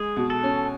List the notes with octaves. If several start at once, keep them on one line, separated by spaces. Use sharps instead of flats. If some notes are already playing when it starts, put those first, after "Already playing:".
Already playing: G#3 G#4
B2
A4
C#4